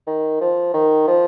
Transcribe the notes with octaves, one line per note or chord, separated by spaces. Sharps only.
D#3
F3
D#3
F3